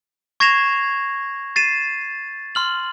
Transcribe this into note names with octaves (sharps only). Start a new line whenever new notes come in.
C#6 G#6 A#6 C7 E7 F7
A6 C7 D#7 E7
C6 F6 F#7